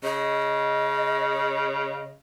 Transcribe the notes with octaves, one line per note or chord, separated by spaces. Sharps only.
C#3 D#5